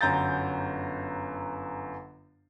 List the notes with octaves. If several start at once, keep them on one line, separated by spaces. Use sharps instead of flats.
G1 F#2 A#5 G6 A6